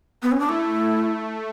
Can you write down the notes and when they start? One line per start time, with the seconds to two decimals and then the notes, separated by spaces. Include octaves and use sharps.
0.23 B3
0.32 C#4
0.40 D4
0.49 A3 E4